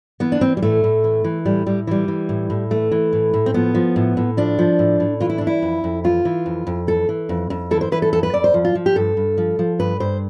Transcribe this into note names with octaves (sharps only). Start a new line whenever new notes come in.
E3 B3
D4
E3 C4
G3
A2 A3
A2
E3
E3
A2 G3
A2 G3
E3 G3
E3
A2
A2
E3 A3
E3
A2
A2
C4
F3 B3
F3
A2
A2
F3 D4
F3
A2
A2
E3 F4
E4
E3 D4
E4
F2
F2
E3 F4
E3
F2
F2
E3 A4
E3
F2
F2
E3 A4
C5
E3 B4
A4
F2 A4
B4
F2 D5
C5
F3
F4
F3
G4
G2 A4
G2
F3
F3
G2 B4
G2 C5